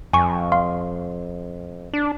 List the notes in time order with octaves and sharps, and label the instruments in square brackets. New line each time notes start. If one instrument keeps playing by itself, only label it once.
[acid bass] F2 [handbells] G#5 C#6
[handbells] F5 C6
[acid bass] D4